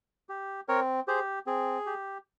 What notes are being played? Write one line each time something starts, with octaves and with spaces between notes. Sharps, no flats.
G4
C4 A#4 C#5
G4 G#4 C5
C4 G#4
G4